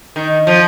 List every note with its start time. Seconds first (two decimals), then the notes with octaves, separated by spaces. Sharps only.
0.16 D#3
0.47 F3